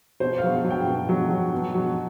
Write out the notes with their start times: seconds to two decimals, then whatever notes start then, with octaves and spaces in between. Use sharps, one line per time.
0.20 B2 C5
0.38 F5
0.43 F#3
0.64 F#3
0.70 G5
0.87 B2
1.09 F#3
1.30 F#3
1.53 B2
1.75 F#3